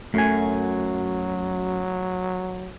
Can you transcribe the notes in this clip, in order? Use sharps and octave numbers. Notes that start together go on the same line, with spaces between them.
F#2 F#3 A3 G#5